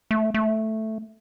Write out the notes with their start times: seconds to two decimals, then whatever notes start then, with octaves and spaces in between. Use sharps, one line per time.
0.11 A3
0.34 A3